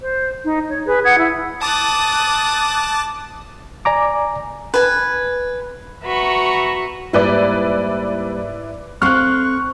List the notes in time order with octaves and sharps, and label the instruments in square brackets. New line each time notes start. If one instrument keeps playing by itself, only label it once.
[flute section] C5
D#4
C#5
G#4 B4
F#5 D#6 G#6
E4
[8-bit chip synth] A5 D6 A6 [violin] D#6 F#6
[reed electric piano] D5 G#5 A#5 D6
[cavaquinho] B4 G#5
[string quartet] F#4 B4 E5 A#5 B5 C#6
[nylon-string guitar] G#2 G3 A#3 [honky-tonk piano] E4 B4 D5
[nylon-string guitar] C4 A4 F5 [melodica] C#6 [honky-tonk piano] F6 F#6